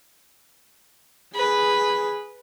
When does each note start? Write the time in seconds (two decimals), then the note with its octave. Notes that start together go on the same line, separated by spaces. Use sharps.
1.35 G#4 B4